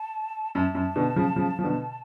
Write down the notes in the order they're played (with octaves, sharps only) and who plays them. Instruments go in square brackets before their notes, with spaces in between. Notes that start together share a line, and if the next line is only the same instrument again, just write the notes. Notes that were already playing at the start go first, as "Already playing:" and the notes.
Already playing: [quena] A5
[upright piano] F#2 [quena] A5
[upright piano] F#2
B2 D3
C#3 F3
C#3 F3
F3
B2 D3